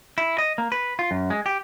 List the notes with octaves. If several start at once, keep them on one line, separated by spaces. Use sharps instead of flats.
E4
D#5
A#3
B4
F4
F#2
G#3
G4